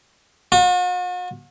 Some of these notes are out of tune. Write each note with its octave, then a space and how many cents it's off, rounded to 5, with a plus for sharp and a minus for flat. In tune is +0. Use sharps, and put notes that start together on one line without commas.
F#4 -45